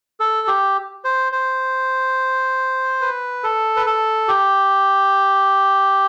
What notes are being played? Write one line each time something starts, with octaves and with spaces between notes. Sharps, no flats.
A4
G4
C5
C5
B4
A4
B4
A4
G4